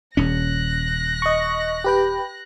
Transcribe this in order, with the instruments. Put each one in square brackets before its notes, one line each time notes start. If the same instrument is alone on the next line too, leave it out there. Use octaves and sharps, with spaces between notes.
[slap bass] D#1 C#4 [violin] F#6 A#6
[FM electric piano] D#5 C#6
G4 B4 G5